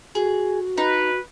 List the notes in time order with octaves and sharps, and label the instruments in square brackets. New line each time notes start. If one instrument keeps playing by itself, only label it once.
[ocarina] F#4 [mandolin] G#4
[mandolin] D#4 [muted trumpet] B4